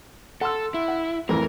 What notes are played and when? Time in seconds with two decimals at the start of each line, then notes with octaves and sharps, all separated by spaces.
0.41 A4 F#5 C6 E6
0.74 E4
0.88 F#5
1.29 F2 A2 E3 A#4